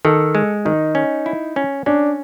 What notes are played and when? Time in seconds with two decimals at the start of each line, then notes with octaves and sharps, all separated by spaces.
0.05 D#3 A4
0.35 G#3
0.65 D#3 D#4
0.95 C#4
1.26 E4
1.56 C#4
1.86 C#4 D4